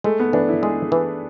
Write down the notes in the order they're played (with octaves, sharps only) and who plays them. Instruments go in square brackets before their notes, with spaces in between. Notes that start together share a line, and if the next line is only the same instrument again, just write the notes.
[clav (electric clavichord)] G#3 [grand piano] A3
[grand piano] B3
[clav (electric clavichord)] E3 [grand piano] D4
[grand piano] E4
[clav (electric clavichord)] G#3 [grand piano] G#4
[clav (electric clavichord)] E3